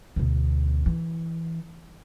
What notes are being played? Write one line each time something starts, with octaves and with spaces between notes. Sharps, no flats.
D2 B2
E3